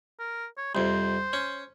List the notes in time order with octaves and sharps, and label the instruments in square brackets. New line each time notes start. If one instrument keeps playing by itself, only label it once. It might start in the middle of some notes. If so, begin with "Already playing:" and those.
[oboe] A#4
C#5
[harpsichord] C2 F2 [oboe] C5
[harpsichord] C#4